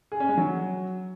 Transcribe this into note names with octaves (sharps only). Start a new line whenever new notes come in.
G#4
C#4
G#3
F#3